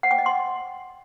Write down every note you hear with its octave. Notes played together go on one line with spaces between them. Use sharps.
F#5
G5
D#5
C6